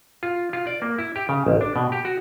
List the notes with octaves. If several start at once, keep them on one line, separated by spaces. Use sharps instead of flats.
F4
F4
D5
A#3
E4
G4
C#3
A1
D4
B2
G4
F#4